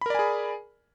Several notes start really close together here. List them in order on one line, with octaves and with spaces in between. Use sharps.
B5 A#4 D5 G#5 G#4